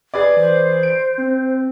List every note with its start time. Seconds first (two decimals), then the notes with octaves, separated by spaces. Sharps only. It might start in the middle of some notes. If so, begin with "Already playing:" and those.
0.14 G#4 B4 D5 G#6
0.37 E3 C5
0.83 D7
1.18 C4